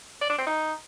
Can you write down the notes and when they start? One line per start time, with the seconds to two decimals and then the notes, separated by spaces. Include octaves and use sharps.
0.21 D5
0.30 D4
0.38 C4
0.47 D#4